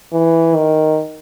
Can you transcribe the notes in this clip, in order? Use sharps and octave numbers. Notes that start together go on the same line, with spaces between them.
E3
D#3